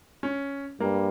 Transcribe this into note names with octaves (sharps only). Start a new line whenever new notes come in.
C#4
G2 A#3